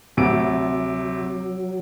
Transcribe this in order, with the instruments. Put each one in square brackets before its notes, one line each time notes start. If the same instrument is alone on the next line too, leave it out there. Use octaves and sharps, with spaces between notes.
[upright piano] D2 C3 D7 [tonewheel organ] F#3